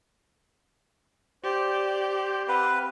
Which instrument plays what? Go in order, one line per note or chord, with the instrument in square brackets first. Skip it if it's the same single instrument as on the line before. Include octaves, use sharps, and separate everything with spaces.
[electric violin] G4 [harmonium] C5 D5
[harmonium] C4 F5 F#5 [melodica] B4